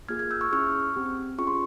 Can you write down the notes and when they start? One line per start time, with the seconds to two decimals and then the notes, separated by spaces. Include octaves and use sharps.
0.09 A#3 F4 G#4 F6 G#6
0.19 F6 G#6
0.31 E6 G6
0.41 C#6 F6
0.52 C#4 E4 G#4 C#6 F6
0.96 C4 G4
1.38 C#4 F4 G#4 C#6
1.47 C6